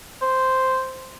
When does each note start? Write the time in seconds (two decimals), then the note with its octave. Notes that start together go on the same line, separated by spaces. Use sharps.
0.22 C5